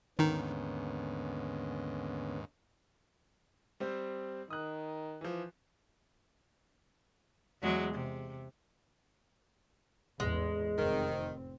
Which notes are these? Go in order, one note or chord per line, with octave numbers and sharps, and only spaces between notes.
D#2 G#2 D3 D#3 B3 C#4 D#4
G3 C4 C5
D#3 D#6 F#6
E3 F3
E2 F#3 G#3
C3
A1 E2 G#3
F1 D#3 C4